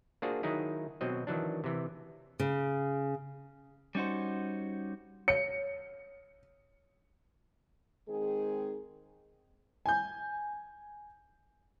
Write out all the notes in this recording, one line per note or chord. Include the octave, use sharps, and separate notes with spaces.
A#3 D4 F4 F#4 G#4 C5
D#3 F#3 D#4 E4 G#4
B2 F#3 C4 D#5
D#3 E3 F#3 D4
C3 E3
C#3
G3 C#4 D#4 F#4 C5
C#5 C#7
D#3 G#3 C4 G#4
G#5 G6